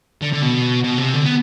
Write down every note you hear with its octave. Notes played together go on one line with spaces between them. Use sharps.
D3
D3
B2
B2
C3
D3
B3